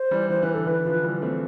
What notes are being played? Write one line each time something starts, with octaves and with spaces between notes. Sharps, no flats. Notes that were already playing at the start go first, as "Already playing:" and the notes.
Already playing: C5
E3 G3
E3 C5
E3 B4
D3 A4
E3 B4
D3 F3
E3 G3
A3 C4